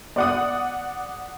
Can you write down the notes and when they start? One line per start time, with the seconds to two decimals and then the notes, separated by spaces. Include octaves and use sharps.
0.16 D5 F#5 D#6